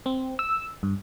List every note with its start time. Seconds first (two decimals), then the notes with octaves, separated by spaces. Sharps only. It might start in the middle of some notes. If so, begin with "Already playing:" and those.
0.06 C4
0.39 E6
0.83 G2